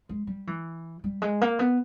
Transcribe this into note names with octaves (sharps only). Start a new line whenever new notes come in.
G#3
G3
E3
G3
G#3
A#3
B3